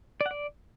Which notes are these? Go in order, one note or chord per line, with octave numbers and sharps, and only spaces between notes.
D5
F#5
D5